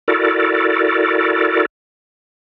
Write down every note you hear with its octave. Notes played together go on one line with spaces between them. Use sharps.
E4 F#4 A4 A#4 D5